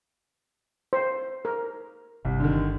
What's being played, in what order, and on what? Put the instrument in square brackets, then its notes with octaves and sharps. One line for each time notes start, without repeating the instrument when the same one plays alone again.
[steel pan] C5
A#4
[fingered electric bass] G1 [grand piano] C2
[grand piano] D3 D#3